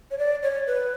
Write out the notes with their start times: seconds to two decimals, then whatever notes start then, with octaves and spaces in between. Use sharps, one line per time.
0.11 C#5
0.18 D5
0.43 C#5
0.67 B4